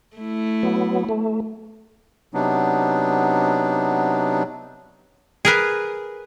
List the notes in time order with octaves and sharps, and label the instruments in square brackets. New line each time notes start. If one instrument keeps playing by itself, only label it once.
[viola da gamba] A3 E4
[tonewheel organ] F#3 B3
A3
[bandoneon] C3 F#3 B3 D4 D#4
[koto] G#4 A#4 B4